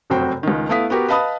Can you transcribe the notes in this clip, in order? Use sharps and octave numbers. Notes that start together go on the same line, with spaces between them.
F1 F#2 C3 F#4 C5 G5
C#2 D#3
A3 B3 E4 F5 D#6 B6
B3 F#4 G4 A#4
B4 D#5 F5 A5 B5 D#6